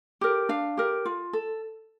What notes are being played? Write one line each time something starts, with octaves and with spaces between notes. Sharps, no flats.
G4 A#4
D4 F5
G4 A#4
F4
A4